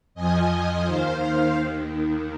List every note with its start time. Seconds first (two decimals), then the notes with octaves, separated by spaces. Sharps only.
0.15 F2 F3 D#5 G#5
0.85 D#2 D#3 C5 F5
1.56 D#2 D#3